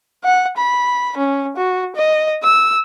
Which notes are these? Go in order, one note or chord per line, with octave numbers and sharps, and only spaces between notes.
F#5
B5
C#4
F#4
D#5
E6